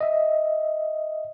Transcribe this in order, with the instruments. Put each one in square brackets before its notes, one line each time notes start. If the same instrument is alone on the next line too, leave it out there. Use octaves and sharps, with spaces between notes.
[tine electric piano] D#5 E5